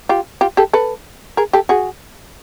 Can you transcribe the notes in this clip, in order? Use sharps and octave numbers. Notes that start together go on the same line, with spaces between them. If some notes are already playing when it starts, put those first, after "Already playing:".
F4 G4
F4 G4
G4 A4
A4 B4
G#4 A#4
G4 A4
F#4 G#4